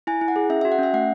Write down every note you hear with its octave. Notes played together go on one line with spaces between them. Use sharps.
E4 G#5
E4
F#5
G#4
C#4 E5
F#4 E5
F#5
C#4 E5
A3 F#5